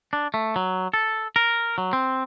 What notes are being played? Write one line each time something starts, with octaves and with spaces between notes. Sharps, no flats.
D4
A3
F#3
A4
A#4
F#3
C4